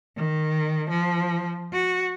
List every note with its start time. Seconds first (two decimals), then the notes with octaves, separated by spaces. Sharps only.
0.17 D#3
0.90 F3
1.73 F#4